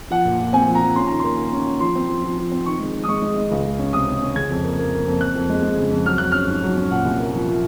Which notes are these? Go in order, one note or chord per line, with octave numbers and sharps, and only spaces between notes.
F3 F#5
A#2
A#2
C4 G#5
F3
A#5
F3
C#4 C6
D#3 A#5
A#3 C6
A#3
C#4
C#4
F3 C6
C4
F3
F3
F3
C4
D#3 C#6
G#3
D#3
D#6
G#3 C#6
G#3
G#3
C#2
C#2
C#4
C3 D#6
C#4
C#4
C#3 G#6
F2
A#3
A#3
A#3
F2
F2 F#6
F2
G#3
G#3
C#3
F2
F#3 F6
F#3 F#6
C#4 F6
G#2
F#3
C#4
A#2 F#5
C2
A#3
F3
F3